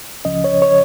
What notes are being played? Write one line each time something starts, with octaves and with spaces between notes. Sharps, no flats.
C#2 C#3 F3 C#4 D#5
C#5
C#5